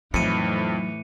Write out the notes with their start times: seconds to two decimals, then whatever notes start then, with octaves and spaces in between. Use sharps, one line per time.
0.14 F2 A2 E3 F#3 D#4 C#7 D#7